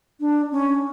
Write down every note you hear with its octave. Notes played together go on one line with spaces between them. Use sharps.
D4
C#4